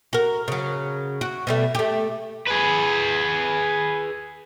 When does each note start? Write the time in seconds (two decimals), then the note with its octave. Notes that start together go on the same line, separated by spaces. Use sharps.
0.13 F#4 A#4
0.48 C#3 F#3
1.21 F#4
1.47 B2 G3 A3
1.75 A3 G4
2.48 G#4 B4